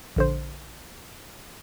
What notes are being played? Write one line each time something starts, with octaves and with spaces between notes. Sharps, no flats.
A#1 D3 C5